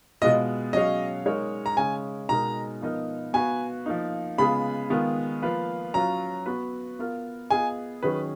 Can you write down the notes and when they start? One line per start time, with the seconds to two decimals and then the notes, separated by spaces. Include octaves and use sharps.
0.21 B2 G#3 B3 F4 D#5
0.73 F#3 C#4 G#4 C#5 D#5 F5
1.26 G#3 D#4 A#4 C#5
1.66 A#5
1.77 C#3 G#3 C#4 G#5
2.29 B2 G#3 D#4 A#4 A#5
2.81 F3 B3 D#4 A#4 D#5
3.33 B3 F#4 B4 F5 G#5
3.86 F3 A#3 D#4
4.38 C#3 G#3 B3 F4 G#4 B5
4.90 D#3 G#3 B3 F4 A#4
5.42 F3 A#3 F4 B4 F5
5.94 F#3 C#4 F4 A#5
6.46 B3 F#4 B4
6.99 B3 F4 A#4
7.50 B3 F4 G#4 D#5 G#5
8.03 D#3 F#3 C#4 G#4 B4